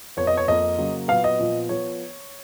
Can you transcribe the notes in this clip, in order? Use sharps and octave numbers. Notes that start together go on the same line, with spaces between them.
F2 F3 B3 C#5
D#5
C#5
F2 F3 A#3 D#5
C#3 F#3 A#3
A#2 F#3 B3 F5
D#5
A#2 F3 B3
F3 B3 C#5